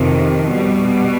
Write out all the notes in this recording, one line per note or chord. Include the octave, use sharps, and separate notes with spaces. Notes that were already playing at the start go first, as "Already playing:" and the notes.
Already playing: F2 C3 D#3
B2 G3